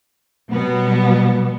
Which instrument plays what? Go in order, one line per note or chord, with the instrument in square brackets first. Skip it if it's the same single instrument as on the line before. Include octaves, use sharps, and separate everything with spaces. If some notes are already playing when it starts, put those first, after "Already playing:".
[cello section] B2 F#3 G3 B3